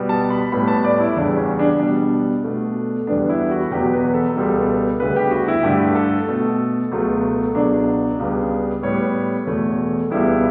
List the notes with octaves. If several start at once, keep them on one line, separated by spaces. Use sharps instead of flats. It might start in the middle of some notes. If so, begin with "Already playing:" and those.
Already playing: B2 G3 B3
A5
B5
A2 G3 B3 B5
A5
D5
E4
E2 C#3 G3 D4
C#4
D4
B2 G3 B3 D4
B2 A3
E2 D3 G3 B3 D4
E4
F#4
E2 B2 F#3 G4
B4
A4
C#2 B2 G3 B3
D2 C#3 G3 B3 B4
G4
F#4
E4
G2 D3 A3 G4
A4
B2 A3
C#2 B2 F#3 A3
C#2 B2 F#3 D4
C#2 C#3 G3 B3
A2 G3 B3 C#5
E2 B2 A3
C#2 B2 G3 B3 E4